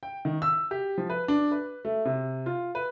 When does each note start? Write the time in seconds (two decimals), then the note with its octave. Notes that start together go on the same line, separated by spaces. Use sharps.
0.03 G5
0.25 D#3
0.42 E6
0.71 G4
0.98 F3
1.10 B4
1.28 D4
1.51 B4
1.85 A3
2.05 C3
2.46 F4
2.75 B4